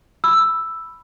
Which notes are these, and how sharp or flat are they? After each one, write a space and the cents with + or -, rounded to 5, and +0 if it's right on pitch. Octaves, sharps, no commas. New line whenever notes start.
B5 +0 E6 +5